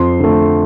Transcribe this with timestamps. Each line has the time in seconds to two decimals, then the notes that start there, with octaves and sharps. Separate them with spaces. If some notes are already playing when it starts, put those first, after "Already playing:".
Already playing: F2 C6
0.20 D3 A3